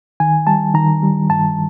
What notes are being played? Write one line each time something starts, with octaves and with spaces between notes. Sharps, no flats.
D#3 G#5
G3 A5
D#3 A#5
G3
G2 A5